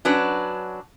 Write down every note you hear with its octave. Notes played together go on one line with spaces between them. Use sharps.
F#3 C#4 D4 F#4 B4